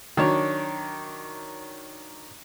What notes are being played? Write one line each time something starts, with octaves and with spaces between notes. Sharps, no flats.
D#3 F#3 D4 C#5